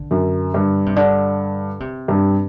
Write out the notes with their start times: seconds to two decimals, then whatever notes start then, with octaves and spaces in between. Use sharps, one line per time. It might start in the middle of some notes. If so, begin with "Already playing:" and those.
Already playing: D3
0.11 F#2
0.54 G2
0.86 C3
0.96 D3
1.80 C3
2.08 G2